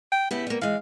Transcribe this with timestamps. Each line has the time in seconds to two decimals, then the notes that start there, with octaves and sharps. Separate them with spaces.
0.12 G5
0.31 C#3 B3 E4 G4
0.47 G3 A#3
0.61 E3 G#3 F5